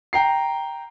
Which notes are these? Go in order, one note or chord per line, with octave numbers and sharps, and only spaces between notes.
G5 A#5 C7